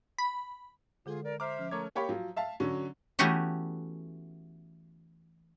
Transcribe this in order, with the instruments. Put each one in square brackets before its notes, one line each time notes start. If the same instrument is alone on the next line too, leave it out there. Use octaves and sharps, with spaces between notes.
[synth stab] B5
[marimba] D3 G#3 A4 [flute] F4 [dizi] G#4
[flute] A#4 [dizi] D5
[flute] C5 [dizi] E5 [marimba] A#5 [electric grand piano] D6 F6
[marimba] F3 C#4
[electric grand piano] A3 C#5 G#6 [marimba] A#4 D6 [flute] A#5
[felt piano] A#3 G4 C#5 B5
F3 F#3
E5 F5 A5
D3 F#3 C#4
[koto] E3 A3 B3 C#4 F#4 G4